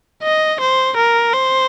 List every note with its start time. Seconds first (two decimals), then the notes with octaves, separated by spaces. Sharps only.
0.23 D#5
0.61 C5
0.97 A#4
1.33 C5